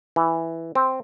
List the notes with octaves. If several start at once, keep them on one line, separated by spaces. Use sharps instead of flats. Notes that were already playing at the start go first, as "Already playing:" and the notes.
E3
C4